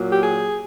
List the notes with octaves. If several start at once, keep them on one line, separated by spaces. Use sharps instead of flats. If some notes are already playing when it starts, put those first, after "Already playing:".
Already playing: A#2 F#3
G4
G#4